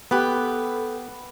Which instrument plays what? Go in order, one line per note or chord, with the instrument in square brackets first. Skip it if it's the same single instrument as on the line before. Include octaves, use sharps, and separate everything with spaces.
[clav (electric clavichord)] B3 [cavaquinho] G4 B4 [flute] A4